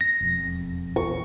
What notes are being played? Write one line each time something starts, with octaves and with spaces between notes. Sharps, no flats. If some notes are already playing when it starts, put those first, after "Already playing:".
A#6
E1 F2
A#1 E2 C#6